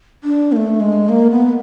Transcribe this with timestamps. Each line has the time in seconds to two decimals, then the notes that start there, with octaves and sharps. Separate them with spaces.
0.24 D4
0.52 A#3
0.56 A3
0.80 G#3
1.09 A#3
1.30 B3